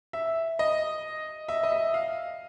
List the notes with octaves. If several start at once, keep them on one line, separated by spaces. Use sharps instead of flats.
E5
D#5
E5
D#5
E5
F5